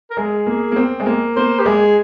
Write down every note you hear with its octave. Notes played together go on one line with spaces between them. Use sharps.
A#4
G#3 G#4
A#3
A#3
C4
G#3
A#3
A#3 C5
G4
G#3 G#4